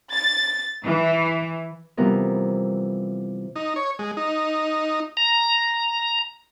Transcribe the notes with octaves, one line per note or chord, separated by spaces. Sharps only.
A6
E3
C3 E3 F3 G3 B3 A#4
D#4
C#5
G#3
D#4
A#5